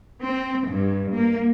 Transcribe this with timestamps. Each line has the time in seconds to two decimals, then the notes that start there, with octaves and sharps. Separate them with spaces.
0.24 C4
0.68 G2
1.14 A#3